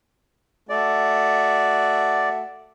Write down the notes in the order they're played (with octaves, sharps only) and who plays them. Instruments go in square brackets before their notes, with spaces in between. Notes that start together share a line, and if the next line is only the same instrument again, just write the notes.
[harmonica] A3 F#4 [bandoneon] D5